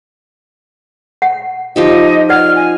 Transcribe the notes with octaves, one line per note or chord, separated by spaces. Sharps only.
F#5
F3 D#4 G4 D#5
D5 D#5 F#5 F6
G#5